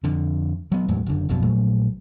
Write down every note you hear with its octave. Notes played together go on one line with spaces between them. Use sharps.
F2 D3
F#3 B3
E2 A2 F#3 G#3
F#1 D3
F1 B1 F2 B2
A#1 A#2 F#3 A3